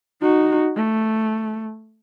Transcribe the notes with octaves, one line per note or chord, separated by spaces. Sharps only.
D#4 F#4
A3